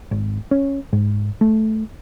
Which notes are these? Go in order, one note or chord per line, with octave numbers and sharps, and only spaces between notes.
G#1
C#4
G#2
A3